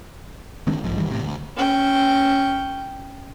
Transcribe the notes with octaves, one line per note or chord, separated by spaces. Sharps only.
D#3 G#3 C4 D4
B1 G#2 F3
F#1 D#3 E3 G3
A2 C3
D2
C#4 G5